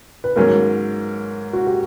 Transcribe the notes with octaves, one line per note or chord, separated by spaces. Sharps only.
B4
G#2 D#3 F#3 A#3 C#4 A#4
F#4
G4